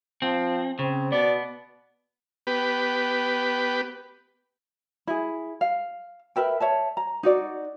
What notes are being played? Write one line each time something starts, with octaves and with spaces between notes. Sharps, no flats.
F3 C4
C#3 C4
B2 B3 D5
B3 G4 B4
E4 G#4
F5
A#4 B4 E5 G5
C#5 E5 A5
A#5
D#4 F#4 D5